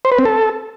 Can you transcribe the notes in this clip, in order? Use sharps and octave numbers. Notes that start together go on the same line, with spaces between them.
C5
B4
C4
A4